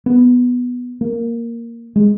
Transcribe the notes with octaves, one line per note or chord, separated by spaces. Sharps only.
B3
A#3
G#3